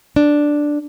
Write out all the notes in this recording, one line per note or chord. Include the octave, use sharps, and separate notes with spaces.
D4